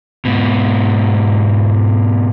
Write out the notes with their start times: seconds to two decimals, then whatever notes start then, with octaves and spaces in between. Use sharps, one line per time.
0.25 G#2 B2